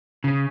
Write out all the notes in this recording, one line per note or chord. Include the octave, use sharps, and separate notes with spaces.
C#3